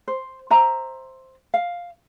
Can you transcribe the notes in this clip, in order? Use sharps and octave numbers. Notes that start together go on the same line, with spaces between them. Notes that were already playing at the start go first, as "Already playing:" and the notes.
C5
C5 E5 A#5
F5